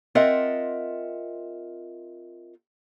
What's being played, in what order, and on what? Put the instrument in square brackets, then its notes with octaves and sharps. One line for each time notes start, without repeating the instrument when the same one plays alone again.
[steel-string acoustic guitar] C4 F4 A#4 D#5 E5 F#5